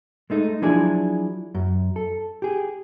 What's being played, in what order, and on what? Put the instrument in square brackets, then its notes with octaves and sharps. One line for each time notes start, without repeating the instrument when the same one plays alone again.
[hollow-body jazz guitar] G#3 A3 D#4
F3 F#3 D4 E4 G#4
F#2
A4
G4 G#4